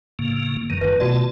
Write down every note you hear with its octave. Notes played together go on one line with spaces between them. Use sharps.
A2 C#3 A#3
F#2 D#3 E3 G3
C#4 F4 B4
B2 A3 F4 F#4 D5 A5